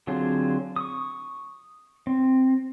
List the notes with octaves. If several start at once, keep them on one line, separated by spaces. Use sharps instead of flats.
D3 F#3 C4 F4 G#4
C#6 D#6
C4